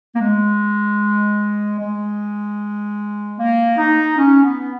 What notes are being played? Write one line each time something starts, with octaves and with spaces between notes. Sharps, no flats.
A#3
G#3
G#3
A#3
D#4
C#4
B3